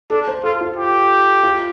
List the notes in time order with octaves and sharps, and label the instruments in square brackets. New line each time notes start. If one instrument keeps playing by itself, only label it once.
[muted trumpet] D4 [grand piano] A4
[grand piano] C5
[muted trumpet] F4 [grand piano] A4
[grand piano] F4
[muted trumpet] G4
[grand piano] F4